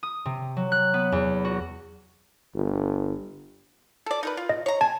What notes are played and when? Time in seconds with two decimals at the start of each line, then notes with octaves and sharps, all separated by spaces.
0.03 D#6
0.25 C3
0.57 F#3
0.72 F#6
0.94 B3
1.12 E2
1.45 F#4
2.55 G1
4.06 A4 D5
4.23 D#4 A#4 B4
4.37 F4
4.49 D#5
4.66 C#5 A#5
4.81 G#5 A5